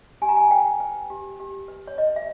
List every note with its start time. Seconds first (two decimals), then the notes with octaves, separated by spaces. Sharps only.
0.22 G4 G#5
0.29 A#5
0.37 G#5
0.51 B4 G5
0.80 B4
1.10 G4
1.40 G4
1.68 B4
1.88 C#5
1.98 B4 D#5
2.16 E5